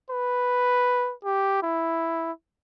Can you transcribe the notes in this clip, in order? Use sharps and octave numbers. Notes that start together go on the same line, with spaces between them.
B4
G4
E4